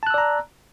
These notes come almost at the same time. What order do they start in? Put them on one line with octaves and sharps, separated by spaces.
A5 F#6 E6 D5 A#5